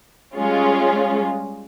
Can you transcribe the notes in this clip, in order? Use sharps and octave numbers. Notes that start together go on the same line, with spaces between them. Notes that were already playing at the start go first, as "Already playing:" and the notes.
G3 G#3 C#4 F4